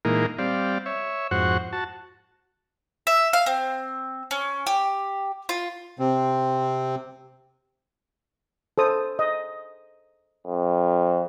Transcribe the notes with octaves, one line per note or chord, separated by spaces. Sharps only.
A#2 E3 G#3 A#3 D#4 A#4
G3 C4 D5 F5
C#5 E5
F2 G#2 F#4 C5 F#5 C#6
F#4 A5
E5
F5
C4
C#4
G4
F4
C3 C4
A4 C5 D#6
D#5
F2